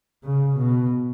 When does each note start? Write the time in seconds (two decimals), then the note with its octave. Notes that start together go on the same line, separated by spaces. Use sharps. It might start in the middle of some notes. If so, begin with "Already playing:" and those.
0.24 C#3
0.56 B2